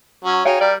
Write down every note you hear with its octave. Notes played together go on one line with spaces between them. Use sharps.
F#3 C#4
D#4 F#4 G#4 C#5 F5 G5
G3 A#4 D5